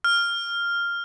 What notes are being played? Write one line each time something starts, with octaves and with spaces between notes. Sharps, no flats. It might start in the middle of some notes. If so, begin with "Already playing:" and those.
F6